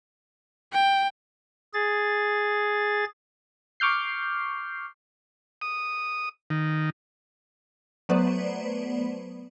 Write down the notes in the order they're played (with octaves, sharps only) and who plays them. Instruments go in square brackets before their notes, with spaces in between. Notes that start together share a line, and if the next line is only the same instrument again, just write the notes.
[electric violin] G5
[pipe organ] G#4 A6
[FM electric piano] C#6 D6 F6 G6 C7
[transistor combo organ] D#6
D#3
[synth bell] F#3 A3 B3 B4 C5 D5